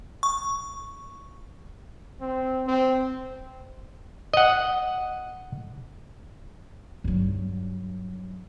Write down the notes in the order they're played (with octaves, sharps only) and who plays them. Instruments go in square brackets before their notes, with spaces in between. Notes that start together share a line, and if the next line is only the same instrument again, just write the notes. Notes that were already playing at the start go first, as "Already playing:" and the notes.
[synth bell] C#6
[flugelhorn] C4
C4
[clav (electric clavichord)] D#5 F#5
[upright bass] G2 F#3